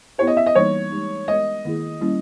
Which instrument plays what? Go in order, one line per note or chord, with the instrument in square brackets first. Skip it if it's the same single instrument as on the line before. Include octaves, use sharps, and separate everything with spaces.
[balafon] B3 E4 G4 [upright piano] C#5
[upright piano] D#5
E5
D#5
[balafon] E3 G3 A#3 D#4 [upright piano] C#5
[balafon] G#3 D#4 G4
[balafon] G#3 B3 G4 A#4 [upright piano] D#5
[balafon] D#3 A#3 E4 G#4
G3 A#3 C#4 E4